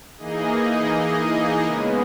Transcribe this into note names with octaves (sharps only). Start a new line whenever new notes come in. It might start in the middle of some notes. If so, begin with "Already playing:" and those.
E3 A#3 D#4 G#4 D#5
C#3 G#3 B3